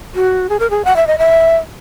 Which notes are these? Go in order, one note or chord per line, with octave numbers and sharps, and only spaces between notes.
F#4
G#4
A#4
G#4
F#5
E5
D#5
E5